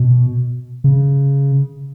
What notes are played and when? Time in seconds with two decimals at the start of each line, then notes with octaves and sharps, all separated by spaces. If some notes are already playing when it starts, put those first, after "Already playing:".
Already playing: B2
0.84 C#3